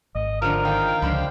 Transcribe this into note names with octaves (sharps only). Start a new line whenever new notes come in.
G#1 D#5
D3 F3 A#4
D#3 F5 G5
C#2 D3 F3 C5 B5